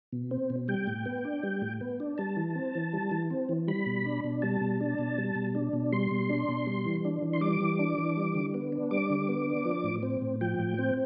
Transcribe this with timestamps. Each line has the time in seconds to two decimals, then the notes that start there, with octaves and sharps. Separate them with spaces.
0.13 B2
0.31 C4
0.50 B2
0.68 G3 G5
0.87 A2
1.06 B3
1.25 D4
1.43 G3
1.62 A2
1.81 B3
2.00 D4
2.18 G3 A5
2.37 E3
2.55 C4
2.75 E3
2.93 G3
3.11 E3
3.30 C4
3.49 E3
3.68 G3 B5
3.86 B2
4.05 D4
4.24 B2
4.42 G3 A5
4.61 B2
4.80 D4
4.98 B2
5.18 G3
5.35 B2
5.55 D4
5.73 B2
5.92 G3 C6
6.11 B2
6.30 D4
6.49 B2
6.67 G3
6.85 E3
7.05 D4
7.22 E3
7.33 C6
7.41 G3 D6
7.61 E3
7.79 D4
7.98 E3
8.17 G3
8.35 D3
8.54 B3
8.72 D4
8.91 G3 D6
9.10 D3
9.29 B3
9.47 D4
9.65 F3
9.84 A2
10.03 C4
10.21 A2
10.41 F3 G5
10.59 A2
10.78 C4